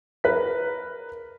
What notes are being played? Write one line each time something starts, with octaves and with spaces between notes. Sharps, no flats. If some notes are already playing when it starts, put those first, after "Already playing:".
A#4 B4 B6